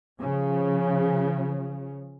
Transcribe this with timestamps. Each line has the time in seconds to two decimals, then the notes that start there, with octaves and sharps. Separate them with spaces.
0.19 C#3 F3